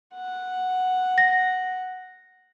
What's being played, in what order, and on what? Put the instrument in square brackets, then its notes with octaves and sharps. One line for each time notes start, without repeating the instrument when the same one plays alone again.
[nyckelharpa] F#5
[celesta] A#6